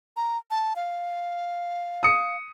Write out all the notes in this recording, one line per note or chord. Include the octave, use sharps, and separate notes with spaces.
A#5
A5
F5
D#6 C#7